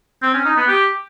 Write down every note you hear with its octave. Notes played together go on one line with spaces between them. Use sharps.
C4
C#4
D#4
B3
G4